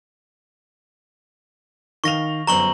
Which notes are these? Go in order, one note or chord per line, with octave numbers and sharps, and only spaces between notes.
D#3 F5 C#6 A#6 F7
G1 F#2 C5 A#5 C#6 F#7